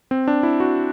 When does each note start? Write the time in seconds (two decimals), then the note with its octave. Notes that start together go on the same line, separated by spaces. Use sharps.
0.11 C4
0.28 D4
0.43 E4
0.60 F#4